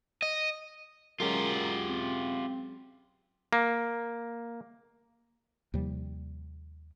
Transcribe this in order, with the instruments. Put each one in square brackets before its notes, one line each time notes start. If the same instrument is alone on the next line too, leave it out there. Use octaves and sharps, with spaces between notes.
[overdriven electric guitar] D#5
[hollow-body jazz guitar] F#3 G#3 C#4 [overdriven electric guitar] F4 G4 [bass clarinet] A#4
[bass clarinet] C4
[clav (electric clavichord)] A#3
[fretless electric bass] D#2 C3 F3 G3